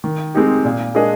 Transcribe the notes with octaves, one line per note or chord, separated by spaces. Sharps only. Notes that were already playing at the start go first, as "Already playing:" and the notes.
D#3
G#3 C4 D#4 G4
A#2
G#3 D4 G#4 D#5